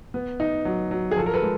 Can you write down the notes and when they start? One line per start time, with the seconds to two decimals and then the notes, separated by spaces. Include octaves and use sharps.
0.14 B3
0.40 D#4
0.65 F#3
0.91 F#3
1.11 G#4
1.16 F3 A4
1.26 A#4
1.34 A4 B4
1.42 G#3